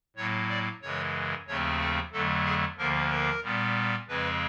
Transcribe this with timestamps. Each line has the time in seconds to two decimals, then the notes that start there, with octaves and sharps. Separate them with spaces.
0.16 A2 F#3 A#3 C#5
0.49 D5
0.82 F#2 C#3 E3 G#3 C#5
1.47 D#2 C#3 F3 A3 C4 C#5
1.80 A4
2.12 F2 D3 F#3 A3 A4
2.45 G#4
2.78 D2 D3 F3 A#3 A#4
3.11 A#4
3.43 A#2 G3 B3
4.08 F2 C#3 F3 G#3 C4 B4